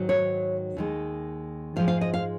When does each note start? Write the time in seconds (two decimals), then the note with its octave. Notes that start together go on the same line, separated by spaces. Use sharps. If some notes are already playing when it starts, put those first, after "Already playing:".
Already playing: G#2 D#3 F#3
0.09 C#5
0.77 D#2 D#3 G#3
1.76 G#2 F3 G#3 F5
1.88 F5
2.01 D#5
2.14 F5